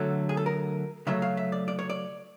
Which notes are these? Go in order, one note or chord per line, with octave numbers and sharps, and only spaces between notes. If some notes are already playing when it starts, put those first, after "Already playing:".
Already playing: D3 F#3 A3 A4
G#4
A4
A#4
C#3 F#3 A3 E5
F5
E5
D5
D5
C#5
D5